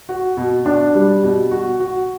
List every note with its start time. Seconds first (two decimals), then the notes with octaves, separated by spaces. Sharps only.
0.09 F#4
0.37 B2
0.66 D4
0.95 G3
1.23 B2
1.51 F#4
1.80 F#4